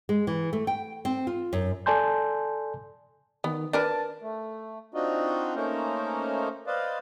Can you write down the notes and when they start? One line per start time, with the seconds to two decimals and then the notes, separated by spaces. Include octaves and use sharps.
0.09 G#3
0.27 E3
0.53 A3
0.67 G5
1.05 C4
1.27 F4
1.53 F#2
1.86 A4 D5 G#5 A5 C6 G6
3.44 D#3 B3
3.73 D4 A#4 B4 A5
4.21 A3
4.94 C4 D4 D#4 F4 F#4 D#5
5.55 A3 A#3 C#4 D#4 A#4 C5
6.67 B4 C5 D5 D#5 F5